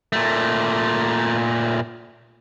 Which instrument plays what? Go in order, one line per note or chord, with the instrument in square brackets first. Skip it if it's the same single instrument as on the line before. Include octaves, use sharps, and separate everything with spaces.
[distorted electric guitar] A#2 A3